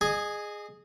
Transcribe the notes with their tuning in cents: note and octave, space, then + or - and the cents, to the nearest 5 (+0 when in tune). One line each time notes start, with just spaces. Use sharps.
G#4 +0 D#5 -30 G#5 +0